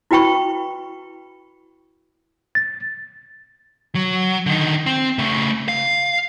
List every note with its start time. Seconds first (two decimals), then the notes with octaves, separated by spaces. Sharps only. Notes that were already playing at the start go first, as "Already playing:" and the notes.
0.11 E4 F#4 B4 G5 B5 C#6
2.55 A6
3.95 F#3
4.46 D3 D#3
4.86 C4
5.18 C#3 A3
5.68 F5